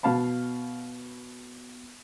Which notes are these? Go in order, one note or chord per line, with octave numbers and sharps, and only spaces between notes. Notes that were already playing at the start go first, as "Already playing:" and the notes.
B2 F5 A5 B5